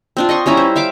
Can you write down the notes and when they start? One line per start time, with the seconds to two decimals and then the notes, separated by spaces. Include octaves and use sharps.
0.17 C4 D4 F4
0.29 D#5 C6 C#6
0.46 G3 C#4 E4 A#5
0.57 C5
0.76 E5 F5 D6